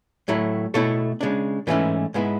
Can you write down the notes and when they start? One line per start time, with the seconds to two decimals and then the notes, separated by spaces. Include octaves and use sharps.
0.28 A2 F#3 A3 E4
0.74 B2 A3 E4 A4 C#5
1.21 C#3 G#3 D4
1.67 G#2 E3 A3 C#4 E4 B4 D5
2.14 G#2 G#3 B3 E4